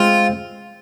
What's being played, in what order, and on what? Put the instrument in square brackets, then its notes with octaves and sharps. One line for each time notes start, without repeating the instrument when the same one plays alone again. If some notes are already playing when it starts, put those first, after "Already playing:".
Already playing: [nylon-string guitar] G#3 C4 [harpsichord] F4